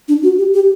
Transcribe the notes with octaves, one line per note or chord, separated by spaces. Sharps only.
D4
F#4
G4
G4